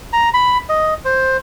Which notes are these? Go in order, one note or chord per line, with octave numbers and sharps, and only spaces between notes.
A#5
B5
D#5
C5